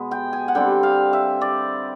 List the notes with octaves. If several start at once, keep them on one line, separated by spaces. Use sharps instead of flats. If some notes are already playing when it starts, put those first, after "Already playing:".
Already playing: B2 G#3 B3
G5
G#5
F#5
D3 G3 C4 G5
F5
E5
D5